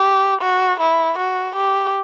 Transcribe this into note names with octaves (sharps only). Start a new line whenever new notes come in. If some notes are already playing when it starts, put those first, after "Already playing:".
Already playing: G4
F#4
E4
F#4
G4